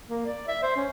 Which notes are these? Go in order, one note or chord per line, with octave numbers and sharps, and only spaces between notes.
A#3
D5
E5
C5
C#4